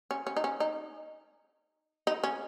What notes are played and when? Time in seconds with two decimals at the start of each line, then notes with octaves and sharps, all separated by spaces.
0.11 C#4
0.27 C#4
0.37 D#4
0.44 C#4
0.60 D#4
2.07 D#4
2.24 C#4